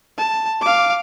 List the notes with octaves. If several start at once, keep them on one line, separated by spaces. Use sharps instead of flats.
A5
F5 D6